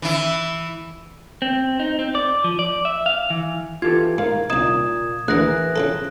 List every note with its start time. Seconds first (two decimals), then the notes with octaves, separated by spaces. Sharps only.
0.02 E3 E4
1.42 C4
1.79 D#4
1.99 C4
2.15 D5
2.44 F3
2.59 D5
2.85 E5
3.06 F5
3.30 E3
3.82 E3 F4 G4 A4 G#6
4.18 G#2 A#4 F5
4.50 C2 A#2 D#4 D#6 G#6 E7
5.28 D2 D3 E3 G#4 A#4 F#6 A#6
5.76 C#3 F3 A4